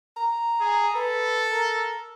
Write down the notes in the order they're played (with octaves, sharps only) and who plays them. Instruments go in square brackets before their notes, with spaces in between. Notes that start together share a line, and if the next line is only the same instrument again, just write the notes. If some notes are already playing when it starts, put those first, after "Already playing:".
[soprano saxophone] A#5
[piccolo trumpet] G#4
[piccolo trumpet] A4 [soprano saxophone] B4
[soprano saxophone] A#4